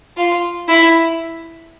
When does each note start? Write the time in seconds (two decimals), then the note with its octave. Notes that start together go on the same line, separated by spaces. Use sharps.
0.17 F4
0.68 E4